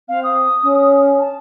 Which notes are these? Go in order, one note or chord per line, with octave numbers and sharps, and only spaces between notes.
C4 F5
D#6
C#4
A5